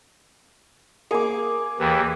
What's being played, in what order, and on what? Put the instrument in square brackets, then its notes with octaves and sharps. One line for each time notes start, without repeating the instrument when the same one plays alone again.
[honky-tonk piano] A#3 [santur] G#4 D6
[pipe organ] D#2 E3 [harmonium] G4